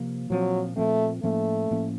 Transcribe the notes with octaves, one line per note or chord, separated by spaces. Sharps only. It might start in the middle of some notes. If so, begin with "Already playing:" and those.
Already playing: C3 F3 A#3
A#2 F3 F#3 C4
A#2 F3 A3 C4
A2 F3 A3 A#3 C#4
A2 F3 A#3 C#4